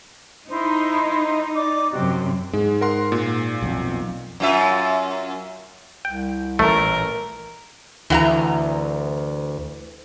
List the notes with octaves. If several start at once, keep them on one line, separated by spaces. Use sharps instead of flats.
D#4 E4 C5
D5 D6
F#2 C3 F#4 G4
G#2 G#3
A#4 F#5 C6
A#2
B1 F2
F#2 F4 E5
C2 G5
A1 A#2 A3 A#4
D2 E3 F#5 A#5